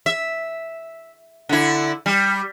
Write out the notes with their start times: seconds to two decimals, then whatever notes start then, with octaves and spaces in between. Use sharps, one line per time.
0.06 E5
1.49 D3 E4
2.06 G3